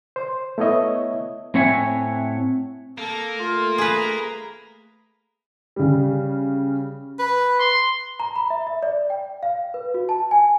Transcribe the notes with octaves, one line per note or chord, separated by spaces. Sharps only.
C5
A3 B3 E4 C#5 D#5 E5
A2 C4 C#5 E5 F#5 G#5
A#3 A4 A#5
A3 F4
G#4 B4 A#5
C#3 G3
B4
C6
A#5
B5
E5
E5
D5
G5
F5
B4
F#4
A5
G#5